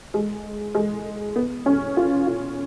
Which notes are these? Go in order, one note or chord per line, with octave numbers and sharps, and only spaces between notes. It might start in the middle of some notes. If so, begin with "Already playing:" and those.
G#3
G#3
B3
C#4
F4
F4